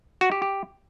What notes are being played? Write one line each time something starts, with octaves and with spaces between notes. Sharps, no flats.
F#4
G4
G4